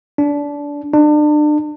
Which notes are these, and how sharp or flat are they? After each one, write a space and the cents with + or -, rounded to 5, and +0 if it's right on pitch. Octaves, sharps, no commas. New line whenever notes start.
D4 -20
D4 +35